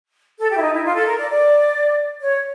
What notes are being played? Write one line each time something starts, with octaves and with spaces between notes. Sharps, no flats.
A4
G4
E4
D#4
E4
F4
A4
A#4
D5
D5
C#5